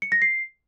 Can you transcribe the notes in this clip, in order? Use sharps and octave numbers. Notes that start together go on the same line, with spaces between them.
C#7
A#6
C7